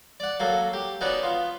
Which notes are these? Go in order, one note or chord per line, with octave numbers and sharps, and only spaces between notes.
D5 F#5
F#3 A#3 A4
G4
B3 C#4 D#4 F#4 D5 F#5
B3 F4